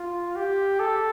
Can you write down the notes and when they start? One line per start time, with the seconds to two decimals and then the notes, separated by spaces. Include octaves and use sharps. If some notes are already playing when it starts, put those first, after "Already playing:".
Already playing: F4
0.36 G4
0.80 A4